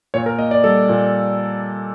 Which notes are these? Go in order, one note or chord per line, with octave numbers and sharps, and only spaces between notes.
A#2 C#5
A#4
A#3 D#5
D5
G3 A4
A#2